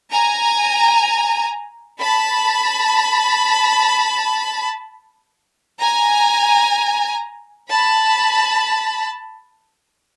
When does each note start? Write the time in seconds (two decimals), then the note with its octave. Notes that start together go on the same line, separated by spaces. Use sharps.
0.11 G#5 A#5
2.00 A5 B5
5.80 G#5 A#5
7.70 A5 B5